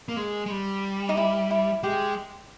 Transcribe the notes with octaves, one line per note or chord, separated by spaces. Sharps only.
A#3
G#3
G#3
G3
D#4
E4
E4
G#3 G4